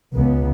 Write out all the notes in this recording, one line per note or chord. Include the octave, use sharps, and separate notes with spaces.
C#2 C#3 B3